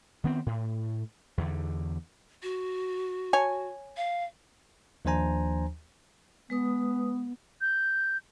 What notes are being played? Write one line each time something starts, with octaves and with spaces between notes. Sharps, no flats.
D#3 B3 C4
A2
E2 D3
F#4
C#5 G#5
F5
D#2 F3 D4 C5 G#5 A#5
G#3 B3 B4 D#6
G6